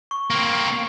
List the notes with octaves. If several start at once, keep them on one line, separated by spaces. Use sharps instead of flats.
C#6
A#3 C4